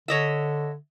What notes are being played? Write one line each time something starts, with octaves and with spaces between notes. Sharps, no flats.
D3 C#5 D#5 E5